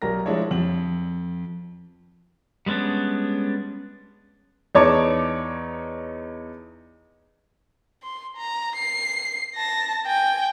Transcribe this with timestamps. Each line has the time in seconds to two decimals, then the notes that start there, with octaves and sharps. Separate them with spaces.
0.02 B1 G3 A#4 A#5 A#6
0.26 F3 G3 G#3 D4 E4 C#5
0.51 F2 F#7
2.66 G3 G#3 B3 C#4 D4
4.75 E2 D#4 C#5 D5 A5 D6
8.03 C6
8.37 A#5
8.76 C7
9.55 A5 A#6
10.05 G5 G#5